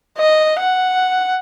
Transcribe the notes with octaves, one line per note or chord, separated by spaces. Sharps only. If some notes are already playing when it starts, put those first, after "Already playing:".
D#5
F#5